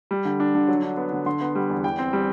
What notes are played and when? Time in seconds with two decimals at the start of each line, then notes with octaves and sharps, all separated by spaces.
0.11 G3
0.25 D3
0.40 D4
0.55 D3
0.68 F#3
0.83 D4
0.97 B3
1.13 D3
1.26 D3 C6
1.41 B3
1.55 G3
1.70 E2
1.84 E3 G5
1.99 C4
2.13 G3